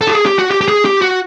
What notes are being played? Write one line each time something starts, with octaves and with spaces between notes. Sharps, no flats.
A4
G4
G#4
G4
F#4
G4
G4
G#4
G4
F#4